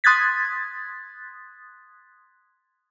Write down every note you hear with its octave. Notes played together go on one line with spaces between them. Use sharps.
C6 D#6 F#6 G#6 A6 B6